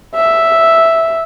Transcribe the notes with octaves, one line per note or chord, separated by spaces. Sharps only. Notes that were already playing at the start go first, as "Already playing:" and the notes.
E5